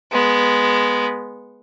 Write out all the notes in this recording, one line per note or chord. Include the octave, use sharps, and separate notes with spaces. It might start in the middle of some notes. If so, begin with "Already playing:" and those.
G#3 B3